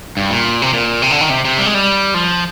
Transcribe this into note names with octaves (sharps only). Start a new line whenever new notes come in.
G2
A#2
C3
A#2
C3
D3
D#3
C3
C3
G3
G#3
G3
F3